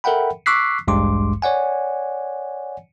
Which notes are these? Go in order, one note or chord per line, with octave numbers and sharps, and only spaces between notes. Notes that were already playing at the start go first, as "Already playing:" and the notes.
A4 A#4 E5 F#5 G5 B5
C#6 D6 E6 F#6 B6 C7
A1 D2 G2 G#3 C6 D6
C#5 D5 F#5 G#5